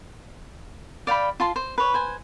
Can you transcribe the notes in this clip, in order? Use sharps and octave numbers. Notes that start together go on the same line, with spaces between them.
D5 F5 G5 B5
F4 A5 C6
C5
B4 C#5
C5 G#5